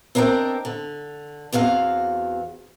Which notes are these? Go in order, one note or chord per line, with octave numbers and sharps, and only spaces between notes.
C4 D4 A#4 D#5 G5
D3
E2 C4 F#4 F5